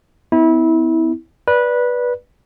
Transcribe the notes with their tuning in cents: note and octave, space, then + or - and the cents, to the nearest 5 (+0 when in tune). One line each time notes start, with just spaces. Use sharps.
B3 +40 E4 -25
B4 -15 D5 +0